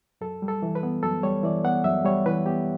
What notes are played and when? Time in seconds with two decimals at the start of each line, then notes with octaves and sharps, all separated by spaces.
0.21 F#2 A4
0.42 G3
0.48 A4
0.62 E3
0.75 B4
0.83 B3
1.03 F#2 A4
1.23 G3 C#5
1.43 E3 D5
1.64 B3 F#5
1.84 F#2 E5
2.05 G3 C#5
2.26 E3 B4
2.46 B3 G4